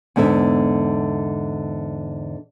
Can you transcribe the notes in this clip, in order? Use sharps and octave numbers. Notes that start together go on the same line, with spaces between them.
E2 G#2 D3 B3 E5